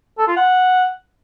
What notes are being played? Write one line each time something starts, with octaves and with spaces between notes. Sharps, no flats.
A4
F4
F#5